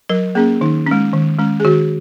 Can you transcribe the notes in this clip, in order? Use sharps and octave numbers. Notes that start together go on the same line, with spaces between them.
F#3 A#4
A#3 C#4 G#4
D#3 D#4
G#3 C#4
D#3
G#3 C#4
G#4
D#3 F#4